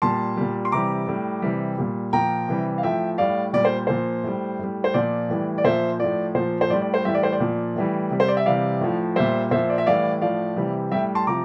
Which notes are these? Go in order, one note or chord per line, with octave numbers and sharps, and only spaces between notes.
A#2 G3 A5 C6
A#2 G3
C6
C3 E3 G3 A#5 D6
A2 G3
C3 E3 G3
A#2 G3
A#2 F3 G5 A#5
C3 E3 G3
F5
A2 F3 E5 G5
A2 G3 D5 F5
A#2 G3 D5
C5
A#2 F3 C5
A2 G3
A2 G3
C5
A#2 F3 D5
A2 E3 G3
D5
A#2 F3 C5 E5
A2 F3 D5
A#2 F3 C5
C5
A2 G3 D5
D5
C5
A2 E3 G3 E5
D5
C5
D5
A#2 F3
A2 E3 G3
C3 G3
C5
D5
E5
C3 E3 G3 D5 F5
A2 F3
A#2 G3 C5 E5
A#2 F3 C5 E5
D5
E5
A2 E3 G3 D5 F5
A2 F3 D5 F5
C3 E3 G3
A2 G3 E5 G5
A5 C6
C3 F3 A#5 D6